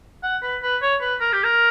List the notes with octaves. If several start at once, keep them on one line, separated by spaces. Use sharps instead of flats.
F#5
B4
B4
C#5
B4
A#4
G4
A#4